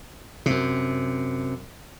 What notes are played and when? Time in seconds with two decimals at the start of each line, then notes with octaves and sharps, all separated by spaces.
0.46 F#2 C3